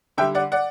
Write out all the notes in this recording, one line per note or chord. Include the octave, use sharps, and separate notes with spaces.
D3 G3 E5 G5
D5 F#5
D5 F#5